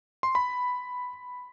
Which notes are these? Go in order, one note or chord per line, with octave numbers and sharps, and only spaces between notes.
C6
B5